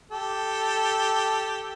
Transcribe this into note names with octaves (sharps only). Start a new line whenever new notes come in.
G4 A4